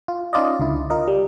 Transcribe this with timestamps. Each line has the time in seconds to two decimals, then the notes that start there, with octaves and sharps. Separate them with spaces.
0.08 F4
0.33 C#4 D#4 F4 D5 D#5
0.59 C#2 D3 E4
0.90 F4 A#4 D#5
1.08 G3